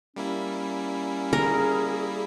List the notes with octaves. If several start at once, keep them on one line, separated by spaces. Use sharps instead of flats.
G3 A#3 C#4 E4
G#4 A#4